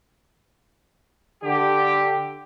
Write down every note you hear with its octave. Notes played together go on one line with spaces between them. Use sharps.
D3 G4